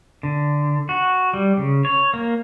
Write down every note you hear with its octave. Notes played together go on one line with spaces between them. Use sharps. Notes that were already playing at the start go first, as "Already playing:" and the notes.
D3
F#4
G3
C#3
C#5
A#3